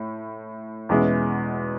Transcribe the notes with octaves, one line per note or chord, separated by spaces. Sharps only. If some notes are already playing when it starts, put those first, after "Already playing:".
Already playing: A2
E2 B2 G#3 C#4 E4